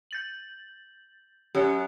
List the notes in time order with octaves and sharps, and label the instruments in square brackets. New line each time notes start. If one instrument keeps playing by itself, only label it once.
[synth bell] G6 A6 F#7
[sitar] F#2 [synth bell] G4 F#6 C#7